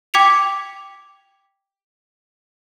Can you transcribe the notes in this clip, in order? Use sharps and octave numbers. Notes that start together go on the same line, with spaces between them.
G5 D6 G#6 B6 C#7 F7